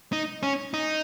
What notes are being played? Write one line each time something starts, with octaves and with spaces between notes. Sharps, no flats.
D#4
C#4
D#4